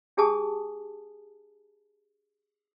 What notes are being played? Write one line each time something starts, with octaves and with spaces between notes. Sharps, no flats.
D4 G4 G#4 G#5 A5 D#6